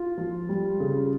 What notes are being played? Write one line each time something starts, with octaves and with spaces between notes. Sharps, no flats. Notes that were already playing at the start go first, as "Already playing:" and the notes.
Already playing: F4
F3
G3
C#3